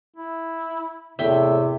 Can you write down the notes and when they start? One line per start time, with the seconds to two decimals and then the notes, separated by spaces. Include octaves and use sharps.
0.17 E4
1.19 E2 A2 C3 E5 G5